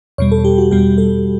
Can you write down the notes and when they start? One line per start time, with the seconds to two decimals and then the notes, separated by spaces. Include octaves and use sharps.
0.18 E2 B2 G3 C#5
0.32 A4
0.45 G4
0.58 F#4
0.71 E2 B2 G3 G4
0.98 A4